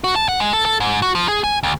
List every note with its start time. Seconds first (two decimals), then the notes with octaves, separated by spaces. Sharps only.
0.04 F#4
0.15 A5
0.28 F#5
0.40 G#3
0.53 A4
0.65 A4
0.80 G#2
1.02 F#4
1.15 F3
1.28 G#4
1.44 G#5
1.63 D2